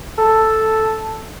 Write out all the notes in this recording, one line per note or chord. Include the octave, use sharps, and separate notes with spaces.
A4